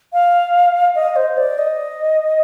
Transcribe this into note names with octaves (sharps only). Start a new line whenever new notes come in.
F5
D#5
C5
D5
D#5